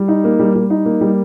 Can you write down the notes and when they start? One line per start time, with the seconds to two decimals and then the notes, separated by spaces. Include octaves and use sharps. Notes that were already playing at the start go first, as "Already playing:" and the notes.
Already playing: G3
0.08 D#4
0.24 A#3
0.39 G3
0.55 G3
0.70 D#4
0.85 A#3
1.01 G3